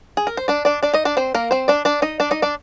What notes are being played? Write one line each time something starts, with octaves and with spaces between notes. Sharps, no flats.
G#4
A#4
C5
D4 D5
D4 D5
D4 D5
D#4 D#5
D4 D5
C4 C5
A#3 A#4
C4 C5
D4 D5
D4 D5
D#4 D#5
D4 D5
D#4 D#5
D4 D5